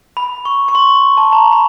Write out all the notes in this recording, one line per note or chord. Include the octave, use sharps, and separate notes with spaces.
B5
C#6
C#6
C6
A5
A#5
B5